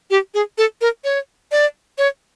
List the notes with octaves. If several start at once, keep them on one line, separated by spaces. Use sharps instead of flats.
G4
G#4
A4
A#4
C#5
D5
C#5